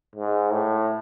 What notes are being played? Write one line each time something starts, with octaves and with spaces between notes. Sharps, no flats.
G#2
A2